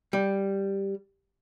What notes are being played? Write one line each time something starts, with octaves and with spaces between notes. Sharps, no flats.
G3